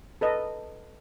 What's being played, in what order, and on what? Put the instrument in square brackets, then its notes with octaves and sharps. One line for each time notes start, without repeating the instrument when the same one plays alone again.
[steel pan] A4 B4 D#5